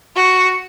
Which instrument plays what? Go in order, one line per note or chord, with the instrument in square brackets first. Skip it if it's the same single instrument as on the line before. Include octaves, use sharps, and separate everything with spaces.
[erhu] F#4